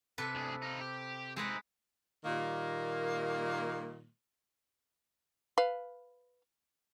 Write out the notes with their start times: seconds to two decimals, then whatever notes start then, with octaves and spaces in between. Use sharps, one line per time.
0.18 C3 A4 B4
0.35 D2 G#4
0.62 D#4 F4
0.81 G4
1.36 G#3 C4 D#4 G#4 B4
2.25 A#2 D#3 G3 A#3
5.58 B4 F5